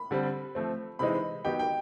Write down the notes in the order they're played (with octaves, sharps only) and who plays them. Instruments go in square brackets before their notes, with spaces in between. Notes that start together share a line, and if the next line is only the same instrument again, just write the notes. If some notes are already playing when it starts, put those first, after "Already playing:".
Already playing: [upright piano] B5
[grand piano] D3 G3 C4
F3 A3 C4
[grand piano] C3 E3 G#3 C4 D#4 [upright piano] B5
[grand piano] D#3 F#3 B3 D#4 G4 [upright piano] G5
[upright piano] G5